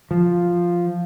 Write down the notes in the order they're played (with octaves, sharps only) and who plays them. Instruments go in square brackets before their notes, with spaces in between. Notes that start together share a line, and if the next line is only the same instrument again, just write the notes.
[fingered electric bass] F3